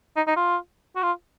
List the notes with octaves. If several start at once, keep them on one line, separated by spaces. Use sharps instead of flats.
D#4
D#4
F4
F#4
F4